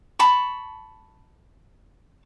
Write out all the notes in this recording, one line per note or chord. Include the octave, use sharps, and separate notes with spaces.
A5 B5 C#6